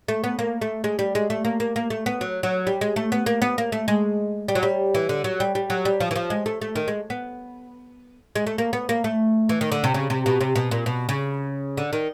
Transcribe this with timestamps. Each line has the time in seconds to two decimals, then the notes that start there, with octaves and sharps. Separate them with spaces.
0.08 A3
0.24 B3
0.39 A#3
0.62 A3
0.84 G#3
0.99 G3
1.15 G#3
1.30 A3
1.45 A#3
1.60 A#3
1.76 A#3
1.90 A3
2.06 B3
2.21 F#3
2.43 F#3
2.67 G3
2.81 G#3
2.96 A3
3.12 B3
3.26 A#3
3.42 B3
3.58 A#3
3.72 A3
3.88 G#3
4.48 G3
4.55 F#3
4.63 G3
4.95 E3
5.09 D3
5.24 F#3
5.40 G3
5.55 G3
5.70 F#3
5.85 G3
6.00 F3
6.11 E3
6.16 F3
6.30 G#3
6.46 A3
6.61 A3
6.76 D#3
6.88 G#3
7.10 B3
8.36 G#3
8.47 A3
8.58 A#3
8.73 B3
8.89 A#3
9.04 A3
9.49 E3
9.61 D#3
9.72 D3
9.84 C3
9.94 C#3
10.10 C3
10.26 B2
10.41 C3
10.56 B2
10.71 A#2
10.86 B2
11.09 C#3
11.77 D3
11.93 D#3